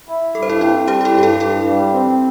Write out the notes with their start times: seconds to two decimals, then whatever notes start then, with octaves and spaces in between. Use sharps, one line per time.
0.09 E4
0.35 G2 A4
0.43 C5
0.49 E4 A4
0.61 C4 E4 A4
0.87 G3 G4 C5
1.01 G4
1.05 E4 A4
1.14 G2 G4
1.23 E4 A4
1.40 G2 E4 A4
1.67 G3
1.94 C4